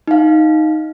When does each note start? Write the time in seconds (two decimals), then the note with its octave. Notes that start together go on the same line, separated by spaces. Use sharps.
0.07 D#4 F5